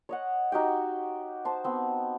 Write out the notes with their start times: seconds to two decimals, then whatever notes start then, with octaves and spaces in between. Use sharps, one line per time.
0.09 C#5 D#5 F#5
0.52 D#4 F#4 G4 G5
1.45 C5 A5
1.64 B3 C4